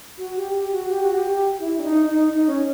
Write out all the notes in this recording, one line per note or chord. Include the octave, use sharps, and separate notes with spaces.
F#4
G4
G4
F#4
G4
F#4
G4
E4
D4
D#4
D#4
D#4
C#4